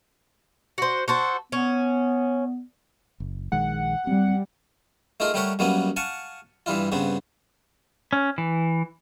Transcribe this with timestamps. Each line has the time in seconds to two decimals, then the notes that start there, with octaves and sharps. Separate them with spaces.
0.78 F#4 C5
1.08 F#4 A4 C5
1.52 B3 C#4
3.20 F#1
3.52 A#1 D#3 G#3 F#5
4.07 G3 C4
5.20 A3 D#4 F4 G#4 A#4
5.34 G3 A3 G4 A#4 C#5 F#5
5.59 F#2 F#3 G3 A#3 B3 G#5
5.96 F5 F#5 G#5 A5 C#6
6.66 G2 E3 G3 E4 F4
6.92 G2 C#3 B3 C4
8.13 C#4
8.38 E3